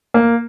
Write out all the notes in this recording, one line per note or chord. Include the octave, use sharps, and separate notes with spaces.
A#3